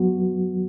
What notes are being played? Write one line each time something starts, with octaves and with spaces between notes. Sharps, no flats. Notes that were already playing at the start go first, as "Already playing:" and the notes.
Already playing: F#3 B3 F#4